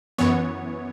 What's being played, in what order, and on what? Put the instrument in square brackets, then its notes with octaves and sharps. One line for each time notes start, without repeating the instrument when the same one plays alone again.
[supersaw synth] F#2 E3 B3 C#5